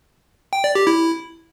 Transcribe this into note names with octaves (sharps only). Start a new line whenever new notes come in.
G5
D5
G4
E4